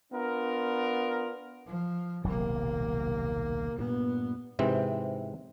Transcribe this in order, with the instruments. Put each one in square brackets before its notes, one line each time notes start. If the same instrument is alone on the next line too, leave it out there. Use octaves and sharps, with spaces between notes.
[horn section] B3 D4 F4 A#4
[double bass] F3
[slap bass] D#1 B1 F#3 [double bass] C3 A#3
[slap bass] G2 A#2 [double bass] B3
[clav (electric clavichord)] G#2 C3 E3 C4